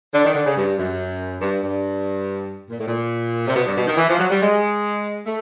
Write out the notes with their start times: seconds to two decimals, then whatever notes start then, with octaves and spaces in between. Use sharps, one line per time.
0.14 D3
0.24 D#3
0.34 D3
0.46 C#3
0.56 G2
0.78 F#2
1.41 G2
1.63 G2
2.70 A#2
2.78 A2
2.86 A#2
3.47 C3
3.55 B2
3.66 G2
3.77 B2
3.87 D#3
3.97 E3
4.09 F3
4.19 F#3
4.30 G3
4.41 G#3
5.25 A3